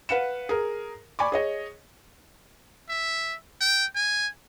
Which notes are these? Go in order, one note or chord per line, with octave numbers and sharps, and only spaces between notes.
B4 F5 F#5 C#7 E7
G#4 A#4
D5 G#5 B5 C#6 D6
G#4 C#5 D#5
E5
G5
G#5